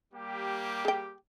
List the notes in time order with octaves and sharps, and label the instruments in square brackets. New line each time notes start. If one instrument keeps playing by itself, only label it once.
[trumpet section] G3 A#3 G4
[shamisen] G#4 G5